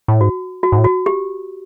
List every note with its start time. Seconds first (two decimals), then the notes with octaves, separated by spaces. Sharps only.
0.08 A2
0.21 G#2 F#4
0.63 F#4
0.72 G#2
0.78 A2
0.84 F#4
1.06 G4